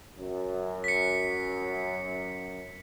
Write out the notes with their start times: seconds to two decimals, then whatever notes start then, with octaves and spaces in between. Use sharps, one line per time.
0.18 F#2
0.84 B6 C#7